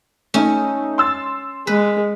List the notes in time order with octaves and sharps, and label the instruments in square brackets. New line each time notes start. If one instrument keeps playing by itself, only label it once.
[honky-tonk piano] A3 D#4 [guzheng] C#4
[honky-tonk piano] C6 E6 A6
[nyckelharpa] G#3 [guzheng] B4